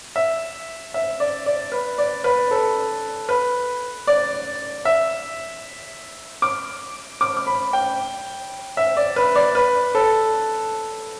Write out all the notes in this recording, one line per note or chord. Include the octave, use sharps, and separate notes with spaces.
E5
E5
D5
D5
B4
D5
B4
A4
B4
D5
E5
D6
D6
D6
B5
G5
E5
D5
B4
D5
B4
A4